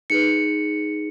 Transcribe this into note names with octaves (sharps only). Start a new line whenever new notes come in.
D#4 G#4 B4 C#7